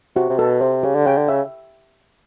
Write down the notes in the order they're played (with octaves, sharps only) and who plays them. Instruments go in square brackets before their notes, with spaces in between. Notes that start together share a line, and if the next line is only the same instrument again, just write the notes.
[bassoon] C3 [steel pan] F#4
[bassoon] C3
[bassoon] B2 [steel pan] A4
[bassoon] C3 [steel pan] C5
[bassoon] C#3 [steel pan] G4
[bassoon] D3
[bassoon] C#3 [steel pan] G5
[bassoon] D3
[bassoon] C#3 [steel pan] E5